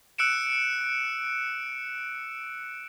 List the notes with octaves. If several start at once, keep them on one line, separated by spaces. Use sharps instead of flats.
E6 F#6 C#7 D7 E7